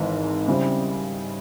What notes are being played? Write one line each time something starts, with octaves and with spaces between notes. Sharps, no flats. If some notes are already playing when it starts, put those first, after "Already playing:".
Already playing: G#1 G#2 E3
C#3 G3 C4 E4